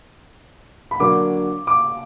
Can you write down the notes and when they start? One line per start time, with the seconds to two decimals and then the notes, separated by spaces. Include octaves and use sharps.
0.91 B5
1.00 D3 F#3 A#3 D4 D6
1.67 D6